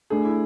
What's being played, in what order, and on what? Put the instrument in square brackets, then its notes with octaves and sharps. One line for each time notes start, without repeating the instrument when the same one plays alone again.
[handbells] A3 D4 A4 [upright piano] G#4
[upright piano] E4